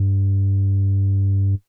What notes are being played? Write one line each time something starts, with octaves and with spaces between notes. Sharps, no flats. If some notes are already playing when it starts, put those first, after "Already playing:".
Already playing: G2